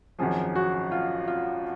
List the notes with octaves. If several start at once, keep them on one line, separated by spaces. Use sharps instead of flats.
G#1 F#2 F3 G#4
F#4
F4
F4